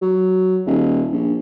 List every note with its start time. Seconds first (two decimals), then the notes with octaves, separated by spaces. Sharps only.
0.02 F#3
0.66 D#1
1.12 A#1